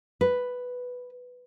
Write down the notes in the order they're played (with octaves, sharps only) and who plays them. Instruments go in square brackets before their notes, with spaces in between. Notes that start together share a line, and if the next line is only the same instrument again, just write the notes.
[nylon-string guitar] B4